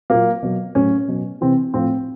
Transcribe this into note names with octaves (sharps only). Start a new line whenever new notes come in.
A#2 F#3 A#3
B2 F#3
A2 F#3 C#4
B2 F#3
C3 E3 C4
A2 F3 C4